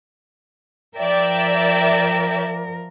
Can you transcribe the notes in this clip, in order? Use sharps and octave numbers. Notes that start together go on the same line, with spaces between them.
F3 A#4 D5 E5 G5